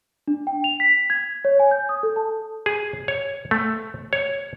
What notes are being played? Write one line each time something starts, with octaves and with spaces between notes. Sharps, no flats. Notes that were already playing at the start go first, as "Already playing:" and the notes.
D4
G5
F7
B6
G#6
C#5
G#5
G6
D#6
A4
A5
G#4
C#5
A3
C#5